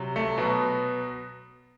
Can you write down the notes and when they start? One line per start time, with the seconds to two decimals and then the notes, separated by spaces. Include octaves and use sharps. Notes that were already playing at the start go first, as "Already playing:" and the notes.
Already playing: C3 F#3
0.16 A3
0.38 B2 F#3 B3